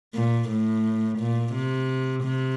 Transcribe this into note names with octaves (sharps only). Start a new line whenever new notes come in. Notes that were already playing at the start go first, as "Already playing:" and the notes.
A#2
A2
A#2
C3
C3